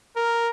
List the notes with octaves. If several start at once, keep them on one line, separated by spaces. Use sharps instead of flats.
A#4